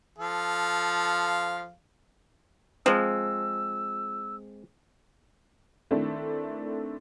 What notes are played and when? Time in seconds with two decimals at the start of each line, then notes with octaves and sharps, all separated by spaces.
0.18 F3 A4 F5
2.86 F3 G#3 C4 E6
5.91 D#3 A3 C4 D4 E4